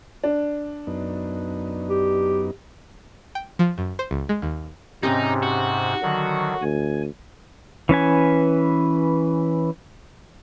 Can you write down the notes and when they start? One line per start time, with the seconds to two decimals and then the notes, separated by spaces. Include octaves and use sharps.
0.24 D4
0.87 F#2 B3 D#4
1.89 G4
3.35 G5
3.59 F3
3.78 F#2
3.99 C5
4.11 C#2
4.29 G#3
4.42 D#2
5.03 G#2 C3 C4 C#4 D#4 G4
5.43 F#4
6.03 D3 D#3 F#3
6.62 D2 G#5
7.89 E3 C#4 B4 G#5